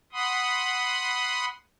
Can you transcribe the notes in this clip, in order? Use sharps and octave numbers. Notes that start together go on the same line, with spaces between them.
F#5 B5 C6 D#6